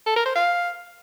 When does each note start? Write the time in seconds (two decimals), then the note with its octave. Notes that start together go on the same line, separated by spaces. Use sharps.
0.06 A4
0.16 A#4
0.26 C5
0.35 F5